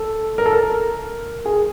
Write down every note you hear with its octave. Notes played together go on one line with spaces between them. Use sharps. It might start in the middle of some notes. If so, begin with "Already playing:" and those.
Already playing: A4
A#4
A4
A#4
G#4